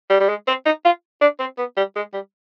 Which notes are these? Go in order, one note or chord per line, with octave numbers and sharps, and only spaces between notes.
G3
G3
G#3
C4
D#4
F4
D4
C4
B3
G3
G#3
G3